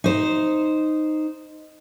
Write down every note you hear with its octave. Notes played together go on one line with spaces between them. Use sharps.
D#4 C5